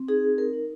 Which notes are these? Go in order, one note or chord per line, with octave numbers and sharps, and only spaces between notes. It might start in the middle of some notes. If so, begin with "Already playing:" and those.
Already playing: C4
D#4 G#4
A#4
D#4